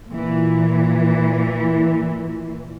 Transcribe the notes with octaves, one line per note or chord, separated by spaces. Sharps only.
A#2 E3